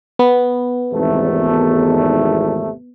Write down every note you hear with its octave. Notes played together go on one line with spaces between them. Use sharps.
B3
G#1 E2 C3 A3